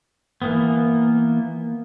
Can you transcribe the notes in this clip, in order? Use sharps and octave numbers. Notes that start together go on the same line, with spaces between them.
E3 A#3 B3